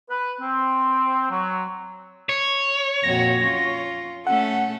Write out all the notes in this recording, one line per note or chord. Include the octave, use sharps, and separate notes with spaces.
B4
C4
F#3
C#5
F2 A#2 F#4 A#6
C#4 F4
A3 C#4 A4 F#5